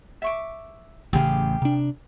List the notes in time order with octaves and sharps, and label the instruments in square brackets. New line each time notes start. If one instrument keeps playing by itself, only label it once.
[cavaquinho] E5 C#6 D6
[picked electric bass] A1 C#3 [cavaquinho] G4 G#4 F5
[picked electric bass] C3 D4